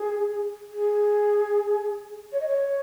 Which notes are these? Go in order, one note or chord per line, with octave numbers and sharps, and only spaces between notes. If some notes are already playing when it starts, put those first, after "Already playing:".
Already playing: G#4
G#4
C#5
D#5
C#5